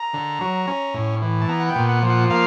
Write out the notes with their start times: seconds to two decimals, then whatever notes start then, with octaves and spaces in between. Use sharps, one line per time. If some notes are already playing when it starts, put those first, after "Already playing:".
Already playing: A#5
0.14 D3
0.41 F#3
0.68 C#4
0.94 A2
1.22 E3
1.41 A5
1.48 B3 A#5
1.60 F#5
1.69 G5
1.75 A#2
1.89 F#5
2.02 F3
2.10 F#5
2.30 A#3 F5